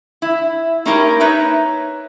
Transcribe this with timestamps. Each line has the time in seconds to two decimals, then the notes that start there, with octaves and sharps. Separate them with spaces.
0.22 E4
0.85 A#3 C#4 D#4 E4 G4 A#4
1.20 D#4 B4 C#5 E5